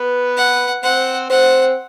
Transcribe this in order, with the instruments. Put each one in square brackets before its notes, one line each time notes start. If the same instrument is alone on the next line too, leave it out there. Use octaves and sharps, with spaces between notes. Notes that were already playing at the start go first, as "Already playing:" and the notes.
Already playing: [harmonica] B3 B4
[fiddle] F#5
[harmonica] C4 C5 [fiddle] F#5
[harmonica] C4 C5 [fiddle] F#5